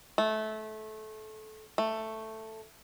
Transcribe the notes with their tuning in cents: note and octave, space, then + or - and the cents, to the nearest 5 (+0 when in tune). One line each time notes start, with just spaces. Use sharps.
A3 -20
A3 +5